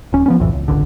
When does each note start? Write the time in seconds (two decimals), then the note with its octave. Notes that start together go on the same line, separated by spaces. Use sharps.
0.13 D#1 C#4
0.26 F3 B3 C#4
0.39 B1 F2 A2 E3
0.53 C#2
0.68 D#1 G#1 C#2 D3